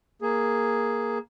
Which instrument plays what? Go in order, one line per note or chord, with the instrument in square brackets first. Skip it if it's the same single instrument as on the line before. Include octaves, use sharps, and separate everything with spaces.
[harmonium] A#3 G#4